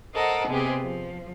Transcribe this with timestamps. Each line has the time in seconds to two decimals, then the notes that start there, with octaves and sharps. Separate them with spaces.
0.14 A4 A#4 C5 D#5 F#5
0.48 C3 G#3 B3 C4 G4 G#4
0.81 F3